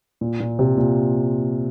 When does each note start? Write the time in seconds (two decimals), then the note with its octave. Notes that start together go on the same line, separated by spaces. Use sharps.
0.21 A#2
0.40 A#2
0.59 C3
0.77 A#2